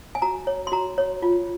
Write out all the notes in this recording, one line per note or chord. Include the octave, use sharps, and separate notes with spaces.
G#5
F#4 A#5
C#5
C6
F#4 A#5
C#5
F4